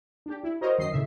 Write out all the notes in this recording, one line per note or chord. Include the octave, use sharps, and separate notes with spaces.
D4 G4
E4
F#4 A#4 C5 C#5 D#5
F#2 D#3 F3 D#5 C7
A2 C#3 E5